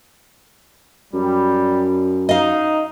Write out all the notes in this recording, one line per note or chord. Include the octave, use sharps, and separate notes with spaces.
F#2 G3
D#4 D#5 F5